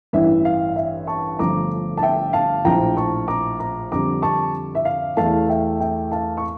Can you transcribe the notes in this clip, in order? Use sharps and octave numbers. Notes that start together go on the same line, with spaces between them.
A1 G2 E3 E5
F5
E5
A5 C#6
G1 G2 F3 A3 A#5 D6
A5
E5 G5
F5 A5
A#1 A2 F3 G5 A#5
A5 C#6
A#5 D6
A#5 D6
F2 D3 G3 A#5 D6
A5 C#6
E5
F5
E2 E3 A3 F5 A5
E5 G5
E5 G5
F5 A5
C#6